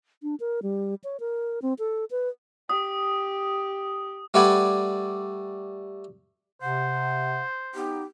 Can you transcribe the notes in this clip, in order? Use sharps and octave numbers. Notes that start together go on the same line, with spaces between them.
D4
A#4
G3
C#5
A#4
C4
A4
B4
G4 D#6
G3 A3 B4 D5 F#5 G#5
C3 C5 F#5
B3 D#4 G4